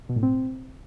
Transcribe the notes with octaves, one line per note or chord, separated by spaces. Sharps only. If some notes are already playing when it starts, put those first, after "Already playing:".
B2
A2
C4